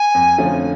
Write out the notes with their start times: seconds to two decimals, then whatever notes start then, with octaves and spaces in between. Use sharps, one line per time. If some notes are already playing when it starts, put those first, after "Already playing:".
Already playing: G#5
0.15 F2
0.38 D3 F3 A3 C#4